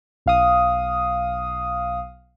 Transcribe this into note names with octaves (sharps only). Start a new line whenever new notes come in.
B1 F5 D#6